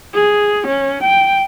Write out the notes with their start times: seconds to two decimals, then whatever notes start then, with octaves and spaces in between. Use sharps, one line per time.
0.15 G#4
0.67 C#4
1.03 G5